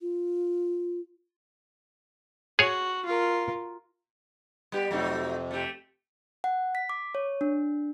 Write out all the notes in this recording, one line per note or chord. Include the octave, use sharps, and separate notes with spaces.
F4
F#4 G#4 C#5
F4 A#4
G3 B3 G4
F2 C3 F#3 A3 D#4
A3 C4 G4
F#5
B6
D6
C#5
D4